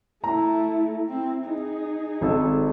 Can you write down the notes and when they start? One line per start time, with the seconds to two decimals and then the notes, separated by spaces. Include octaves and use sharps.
0.24 A3 E4 A#5
1.09 C4 E4
1.46 D#4 G#4
2.21 G#1 A4 D#5